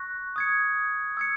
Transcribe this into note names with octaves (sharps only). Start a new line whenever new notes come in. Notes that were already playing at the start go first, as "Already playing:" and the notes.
Already playing: C#6 F#6 A#6
D#6 G#6 C#7
E6 G#6 C#7